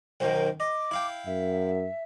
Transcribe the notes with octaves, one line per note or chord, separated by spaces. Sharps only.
B1 F#2 D#3 C5
D#5 D6
E4 F5 G5
F#2 E5